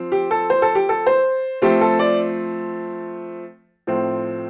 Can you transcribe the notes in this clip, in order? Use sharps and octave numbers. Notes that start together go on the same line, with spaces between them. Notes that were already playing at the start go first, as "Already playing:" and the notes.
Already playing: F3 C4
G4
A4
C5
A4
G4
A4
C5
F3 A3 C4 G4
A4
D5
A2 F3 C4